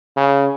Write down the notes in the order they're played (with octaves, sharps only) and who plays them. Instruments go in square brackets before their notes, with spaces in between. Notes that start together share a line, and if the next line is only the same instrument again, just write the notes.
[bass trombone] C#3